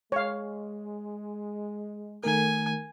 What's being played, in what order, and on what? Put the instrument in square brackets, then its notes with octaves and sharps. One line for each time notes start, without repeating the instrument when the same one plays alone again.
[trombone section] G#3 [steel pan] C#5 F5
[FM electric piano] D#3 A3 A#4 [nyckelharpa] G#5